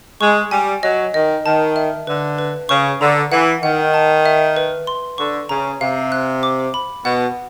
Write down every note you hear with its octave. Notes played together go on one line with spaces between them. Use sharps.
G#3 C#6
G3 G#5
F#3 D#5
D#3 D#5
D#3 A5
E5
D3 B4
B4
C#3 C#6
D3 A#5
E3 F#5
D#3 F#5
A5
E5
B4
C6
D3 C#6
C#3 A#5
C3 F5
F#6
D6
B5
B2 F#5